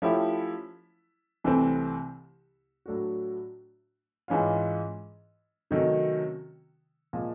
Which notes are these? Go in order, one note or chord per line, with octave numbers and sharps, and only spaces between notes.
F3 A3 C#4 E4 G4
C2 C3 E3 A3 C4
A2 F#3 A3 D4 F#4
G#2 E3 G#3 C#4 F4
C3 D#3 F#3 A3 C#4
A#2 F3 G#3